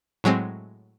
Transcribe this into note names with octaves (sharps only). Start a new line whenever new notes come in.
A2 F#3 G#3 C4